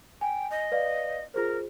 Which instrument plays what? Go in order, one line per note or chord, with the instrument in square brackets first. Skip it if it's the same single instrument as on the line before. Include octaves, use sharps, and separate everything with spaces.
[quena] G5 [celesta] G#5
[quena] D#5
[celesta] B4 D5 F5
[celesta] F4 G#4 C5 [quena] A#4